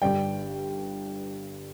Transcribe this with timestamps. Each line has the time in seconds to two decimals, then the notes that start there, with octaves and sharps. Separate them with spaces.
0.02 G1 G2 G3 D5 G5